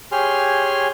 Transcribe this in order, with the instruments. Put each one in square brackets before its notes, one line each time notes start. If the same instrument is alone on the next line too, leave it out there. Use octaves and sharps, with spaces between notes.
[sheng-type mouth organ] G4 G#4 C#5 G#5 C6 F6